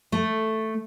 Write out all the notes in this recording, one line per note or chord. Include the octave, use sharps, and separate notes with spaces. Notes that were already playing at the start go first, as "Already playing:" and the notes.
A3